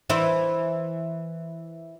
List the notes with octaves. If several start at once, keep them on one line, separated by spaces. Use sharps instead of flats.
E3 E4 C5